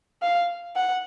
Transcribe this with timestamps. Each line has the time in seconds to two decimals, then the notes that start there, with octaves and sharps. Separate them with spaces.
0.22 F5
0.76 F#5